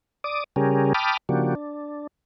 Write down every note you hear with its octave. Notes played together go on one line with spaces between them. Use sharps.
D5 D6 D#6
C#3 G3 C#4 G4 G#4 A#4
G5 A5 B5 D6 D#6 F6
C#3 F3 A#3 D4 F#4 G4
D4